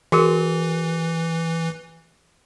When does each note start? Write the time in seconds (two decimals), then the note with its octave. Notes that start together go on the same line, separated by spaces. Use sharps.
0.12 E3 F#4 G#4 A#4